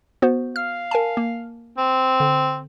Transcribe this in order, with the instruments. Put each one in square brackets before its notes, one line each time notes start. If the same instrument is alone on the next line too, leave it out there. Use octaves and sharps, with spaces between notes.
[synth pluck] B3 F#4 C5
[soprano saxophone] F5 [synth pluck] F6
[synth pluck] A#4 G#5 A5
A#3
[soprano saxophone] C4
[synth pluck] D3